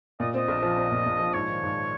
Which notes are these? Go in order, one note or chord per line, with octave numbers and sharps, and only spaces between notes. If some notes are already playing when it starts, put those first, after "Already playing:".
A#2 D#5
C4 D#5
A#1
F3
C4
A#2
A#2
F3
G#2 C#5
D#3
G#2